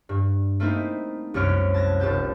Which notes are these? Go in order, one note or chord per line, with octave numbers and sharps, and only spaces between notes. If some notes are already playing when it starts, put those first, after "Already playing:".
G2
A3 A#3 C4 D#4 E4
C2 F#2 C#5 F6 D7
A5 G#6 A#6
F1 G3 A5 G6